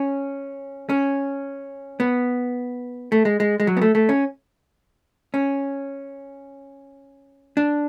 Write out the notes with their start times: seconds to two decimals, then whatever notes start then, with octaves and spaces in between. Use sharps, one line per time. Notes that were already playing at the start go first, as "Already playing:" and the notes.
Already playing: C#4
0.89 C#4
2.00 B3
3.12 A3
3.25 G#3
3.40 G#3
3.60 G#3
3.67 F#3
3.77 B3
3.81 A3
3.95 A3
4.09 C#4
5.34 C#4
7.57 D4